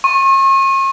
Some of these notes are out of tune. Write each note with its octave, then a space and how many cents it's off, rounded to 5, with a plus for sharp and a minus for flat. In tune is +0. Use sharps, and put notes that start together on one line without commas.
C#6 -40